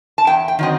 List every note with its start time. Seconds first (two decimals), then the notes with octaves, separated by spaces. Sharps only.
0.18 A5
0.27 E2 G5
0.48 G5
0.59 D#3 F#3 C4 D#5